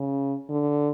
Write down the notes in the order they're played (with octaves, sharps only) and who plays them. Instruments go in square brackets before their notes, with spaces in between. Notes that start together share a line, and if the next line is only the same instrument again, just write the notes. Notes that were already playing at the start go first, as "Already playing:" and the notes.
Already playing: [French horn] C#3
D3